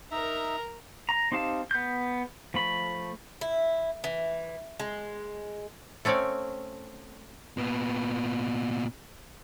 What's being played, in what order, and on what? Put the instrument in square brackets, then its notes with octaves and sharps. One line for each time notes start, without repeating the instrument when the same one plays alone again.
[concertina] D#4 E5 [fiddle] A#4 A#5
[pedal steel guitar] A#5
C4 D#4 G4 F5 A5
B3 G6
F3 A3 B5
[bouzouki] E4
E3
G#3
[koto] A3 C4 C#4 C#5 D5
[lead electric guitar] A#2 B3